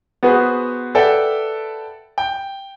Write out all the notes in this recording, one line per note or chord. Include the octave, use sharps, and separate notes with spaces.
B3 F#4 G#4 B4 C5
A4 B4 D5 E5 F#5 G5
G5